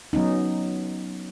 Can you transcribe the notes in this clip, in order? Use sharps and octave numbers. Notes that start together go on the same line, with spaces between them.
F#3 B3 C#4 D#4